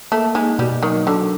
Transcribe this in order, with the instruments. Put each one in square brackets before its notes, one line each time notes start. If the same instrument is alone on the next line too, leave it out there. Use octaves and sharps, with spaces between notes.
[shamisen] A3 [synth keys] A#3
[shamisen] G#3 [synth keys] D#4
[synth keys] B2 [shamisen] G3
[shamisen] D#3 [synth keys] F#3
[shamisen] D3 [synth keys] F#3